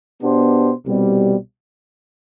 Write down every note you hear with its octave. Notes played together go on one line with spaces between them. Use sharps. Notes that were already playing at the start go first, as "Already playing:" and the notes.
B2 B3 D4 G4 C5
C2 B2 G3 C4